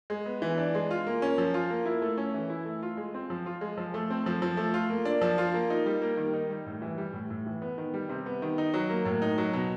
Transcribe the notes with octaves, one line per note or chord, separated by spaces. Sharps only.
G#3
B3
E3
D4
G#3
F4
A#3
C#4
F3
F4
A#3
E4
A3
C#4
E3
E4
A3
F4
G#3
C4
F3
F4
G#3
F3
A3
C4
F3
F3
A3
F4
A#3
D4
F3
F4
A#3
D#4
G3
A#3
D#3
D#4
G3
A2
E3
G3
A2
A2
E3
B3
D#3
G3
C3
B3
D#3
D#4
F#3
A#3
A2
D#4
F#3
B2